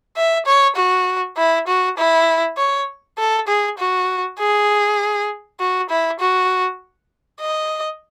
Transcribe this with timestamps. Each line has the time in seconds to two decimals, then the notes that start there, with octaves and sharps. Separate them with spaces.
0.16 E5
0.46 C#5
0.76 F#4
1.37 E4
1.67 F#4
1.98 E4
2.57 C#5
3.18 A4
3.47 G#4
3.78 F#4
4.39 G#4
5.60 F#4
5.89 E4
6.19 F#4
7.40 D#5